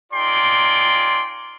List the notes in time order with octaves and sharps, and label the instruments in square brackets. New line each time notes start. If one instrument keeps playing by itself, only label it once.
[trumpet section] D#4 F4 G#4 D5 G5 C6